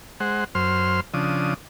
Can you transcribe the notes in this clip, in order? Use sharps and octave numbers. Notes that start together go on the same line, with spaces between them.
G#3 C5 F#5
F#2 C5 C6 F6
C#3 F3 D4 D#6